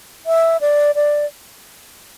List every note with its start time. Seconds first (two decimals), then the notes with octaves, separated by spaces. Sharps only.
0.26 E5
0.61 D5
0.95 D5